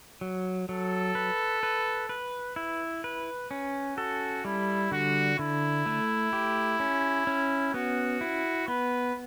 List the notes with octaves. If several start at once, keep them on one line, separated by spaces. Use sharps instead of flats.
F#3
F#3 A4
B4
B4
B4
E4
B4
C#4
F#4 A4
G3 E4
D3 F#4
D3 E4
A3
G4
C#4
C#4
B3 F#4
E4
B3 B4